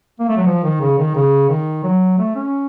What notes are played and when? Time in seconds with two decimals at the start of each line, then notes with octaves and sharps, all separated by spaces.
0.19 A#3
0.28 A3
0.37 F#3
0.46 F3
0.63 D#3
0.81 C#3
0.98 D#3
1.15 C#3
1.49 D#3
1.84 F#3
2.18 A3
2.35 C#4